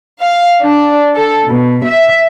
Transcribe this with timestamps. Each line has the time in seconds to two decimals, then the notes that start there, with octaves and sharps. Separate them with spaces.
0.20 F5
0.61 D4
1.15 A4
1.47 B2
1.86 E5